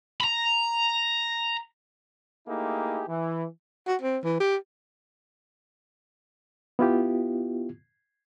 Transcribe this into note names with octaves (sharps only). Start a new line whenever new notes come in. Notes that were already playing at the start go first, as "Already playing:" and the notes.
A#5 B5
A3 A#3 D#4 E4 G4 G#4
E3
F#4
C4
E3
G4
B3 E4 F4 G4